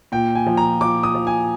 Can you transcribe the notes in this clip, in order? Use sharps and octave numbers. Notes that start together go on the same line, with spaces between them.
A#2 G5
G#5
F3
A#5
F3 D6
D#6
F3
G#5